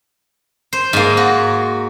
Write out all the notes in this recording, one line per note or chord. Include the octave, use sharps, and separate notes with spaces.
C5
G#2 A#3
F#4